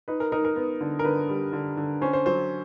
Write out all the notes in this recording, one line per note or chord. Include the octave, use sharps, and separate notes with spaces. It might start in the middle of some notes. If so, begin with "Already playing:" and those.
D#4 B4
A#4
D#4 A#4
A#4
B3
D3
A#4
D3 B4
G3
D3
D3
C#4 C5
C5
F#3 C5